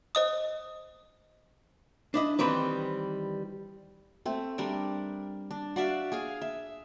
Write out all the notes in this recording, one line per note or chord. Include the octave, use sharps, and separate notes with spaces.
C5 D#5 D#6
D4 E4 D#5
D#3 E3 G3 C4 B4
A3 C4
G3 D4 A#4
D4
F#4 D5 E5 F5
G#4 F5 G#5
E5